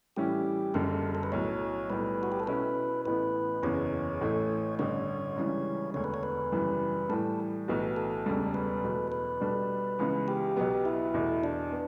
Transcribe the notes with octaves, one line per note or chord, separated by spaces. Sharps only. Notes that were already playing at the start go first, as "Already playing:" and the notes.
A2 E3 G3 C#4 E4 G4
F#1 F#2 D3 G3 A4
A4
B4
B1 A2 F#3 C#5
B1 A2 G3 B4
F#4
G4
A4
B2 A3 C#4 E4 B4
A1 A2 E3 B3 B4
F#1 E2 C#3 E3 B3 C#5
A1 A2 E3 A3
A1 G2 D3 C#5
C#2 C#3 E3 G3
E1 D2 D3 C#5
B4
C#5
B4
F#2 C#3 E3 G3
A2 E3 G3 A4
B1 A2 E3 B3 F#4
A4
E1 D2 C#3 G3
B4
E2 B2 F#3 A3
B4
B2 G3 D4 A4
C#2 C#3 E3 B3
G4
B1 B2 F#3 B3
E4
E2 B2 A3
D4
B3